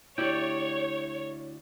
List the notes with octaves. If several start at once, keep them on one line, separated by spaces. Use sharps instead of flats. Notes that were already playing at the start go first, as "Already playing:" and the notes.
D2 E4 G4 C#5 D5 G5